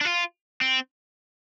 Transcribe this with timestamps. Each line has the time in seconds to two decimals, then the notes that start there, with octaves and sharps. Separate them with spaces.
0.01 D4
0.05 F4
0.61 C4